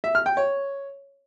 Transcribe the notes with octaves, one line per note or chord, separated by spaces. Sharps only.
E5
F6
G5
C#5